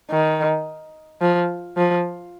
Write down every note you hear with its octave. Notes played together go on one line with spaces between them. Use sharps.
D#3
F3
F3